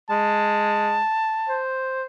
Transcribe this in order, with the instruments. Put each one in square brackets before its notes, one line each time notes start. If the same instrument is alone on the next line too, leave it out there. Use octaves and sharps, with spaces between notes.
[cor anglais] G#3 [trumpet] A5
[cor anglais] C5